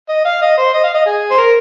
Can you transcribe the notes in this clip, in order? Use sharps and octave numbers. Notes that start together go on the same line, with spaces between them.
D#5
F5
D#5
C5
D#5
F5
D#5
G#4
C5
A#4